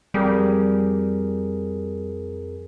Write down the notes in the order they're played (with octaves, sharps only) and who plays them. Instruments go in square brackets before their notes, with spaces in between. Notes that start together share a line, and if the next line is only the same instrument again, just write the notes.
[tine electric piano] F2 G#4 A#4 [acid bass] G3